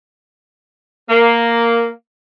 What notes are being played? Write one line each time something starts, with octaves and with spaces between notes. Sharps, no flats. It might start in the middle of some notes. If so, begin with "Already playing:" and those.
A#3